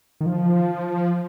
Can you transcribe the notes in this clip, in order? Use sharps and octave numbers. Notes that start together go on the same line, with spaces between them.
D#3
F3